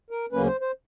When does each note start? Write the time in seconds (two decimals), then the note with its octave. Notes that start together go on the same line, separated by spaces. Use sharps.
0.10 A#4
0.32 D2 C#3 F#3 A#3 C#4 B4
0.46 C5
0.61 C5